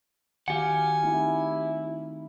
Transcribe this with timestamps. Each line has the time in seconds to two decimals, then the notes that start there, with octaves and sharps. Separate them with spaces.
0.48 D#3 F#4 G4 F5 F#5 G#5
1.03 A3 C4 D#4 E4